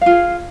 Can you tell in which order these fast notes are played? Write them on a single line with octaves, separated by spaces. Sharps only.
F5 F4 G#4